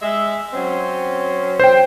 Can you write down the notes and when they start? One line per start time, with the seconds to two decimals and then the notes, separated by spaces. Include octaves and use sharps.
0.02 G#3 E5
0.53 F#3 C4 C#4
1.60 C5 G5